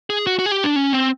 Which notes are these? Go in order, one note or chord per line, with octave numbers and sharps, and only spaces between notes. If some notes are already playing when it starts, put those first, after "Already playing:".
G#4
F#4
F#4
G#4
G4
D4
C#4
C4